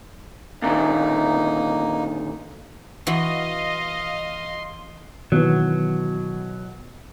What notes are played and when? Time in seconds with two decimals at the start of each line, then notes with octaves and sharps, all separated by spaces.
0.62 A#2 D3 D#3 A#3 D#4
3.07 E3 F#4 D#5 F5 C6
5.32 B2 D#3 E3 F#3 B3